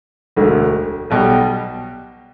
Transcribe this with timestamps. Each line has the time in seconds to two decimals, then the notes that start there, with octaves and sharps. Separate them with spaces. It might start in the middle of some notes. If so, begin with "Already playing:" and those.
0.37 E1 D2 D3
1.10 B1 B2 G3